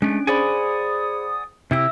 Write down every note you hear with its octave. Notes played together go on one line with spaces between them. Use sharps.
G#3 A3 C#4 D4 D7
G#4 C5 D5 F#5 G#5 B5 D#6
C3 E4 G4 E5 E6